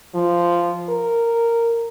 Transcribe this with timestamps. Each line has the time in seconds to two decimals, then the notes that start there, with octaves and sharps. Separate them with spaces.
0.15 F3
0.89 A#4